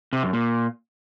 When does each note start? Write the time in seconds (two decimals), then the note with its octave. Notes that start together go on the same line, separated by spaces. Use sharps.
0.13 C3
0.23 F#2
0.33 A#2